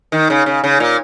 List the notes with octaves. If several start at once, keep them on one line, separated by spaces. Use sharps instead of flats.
D#3
C#3
C#3
C#3
A#2